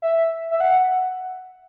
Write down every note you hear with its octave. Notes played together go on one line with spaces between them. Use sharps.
E5
E5
F#5